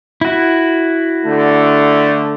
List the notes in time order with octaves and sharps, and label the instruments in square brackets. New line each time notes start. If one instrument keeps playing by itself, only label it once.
[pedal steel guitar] E4 F#4
[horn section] D3 A3